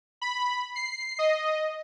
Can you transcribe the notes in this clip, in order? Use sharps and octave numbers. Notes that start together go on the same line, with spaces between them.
B5
C7
D#5